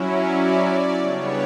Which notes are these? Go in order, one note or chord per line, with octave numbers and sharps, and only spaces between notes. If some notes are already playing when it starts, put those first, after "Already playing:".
Already playing: F#3 C#4 E4
D5
D5
C#3 G3 B3 D4 C#5